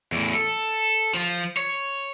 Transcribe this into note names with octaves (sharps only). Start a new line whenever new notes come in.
E2 A2
A4
F3 F4
C#5